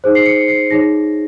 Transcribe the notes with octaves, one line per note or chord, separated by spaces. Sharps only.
D#4 G#4 C5
C7
C#7
C7
D#4 G#4 C#5 A#6